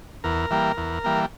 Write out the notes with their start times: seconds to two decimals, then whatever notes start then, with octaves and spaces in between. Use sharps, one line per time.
0.24 E2 A#4
0.51 E3 G3 A#3
0.77 E2
1.04 E3 G3 A#3